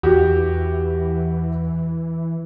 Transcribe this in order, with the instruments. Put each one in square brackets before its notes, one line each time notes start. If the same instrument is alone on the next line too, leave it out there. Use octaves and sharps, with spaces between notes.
[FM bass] E2 [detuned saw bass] E3 [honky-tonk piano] F#4 G4